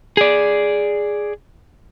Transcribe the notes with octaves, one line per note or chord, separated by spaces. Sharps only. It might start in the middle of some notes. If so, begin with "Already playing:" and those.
G#4 D5